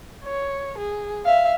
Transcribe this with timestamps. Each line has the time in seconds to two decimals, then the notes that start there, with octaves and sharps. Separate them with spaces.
0.25 C#5
0.78 G#4
1.25 E5 F5